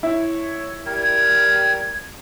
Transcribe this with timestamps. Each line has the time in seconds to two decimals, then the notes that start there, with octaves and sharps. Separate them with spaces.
0.03 E4 C#5
0.86 G3 A#4 G#6